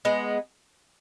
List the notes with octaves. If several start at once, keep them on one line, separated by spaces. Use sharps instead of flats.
G#3 B3